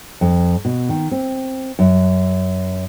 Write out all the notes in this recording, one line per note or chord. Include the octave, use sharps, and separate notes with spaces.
F2
B2
D#3
C4
F#2